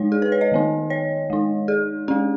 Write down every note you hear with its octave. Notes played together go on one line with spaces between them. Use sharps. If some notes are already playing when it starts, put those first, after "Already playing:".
Already playing: G#3 D#4 C#5
G#4
B4
C#5
D#5
D#3 B3 D#4
C#5
G#3 D#4
G#4
G#3 C#4 G#4